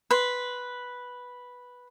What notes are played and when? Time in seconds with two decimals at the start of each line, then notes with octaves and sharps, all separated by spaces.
0.11 B4 C6